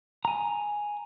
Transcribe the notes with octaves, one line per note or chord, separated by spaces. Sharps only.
G#5 A#5